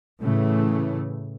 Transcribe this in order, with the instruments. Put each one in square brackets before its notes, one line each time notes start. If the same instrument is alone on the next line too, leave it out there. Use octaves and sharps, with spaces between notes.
[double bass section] A2 C#3 E3 A3